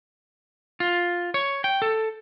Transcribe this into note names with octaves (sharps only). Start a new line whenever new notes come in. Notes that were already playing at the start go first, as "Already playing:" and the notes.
F4
C#5
G5
A4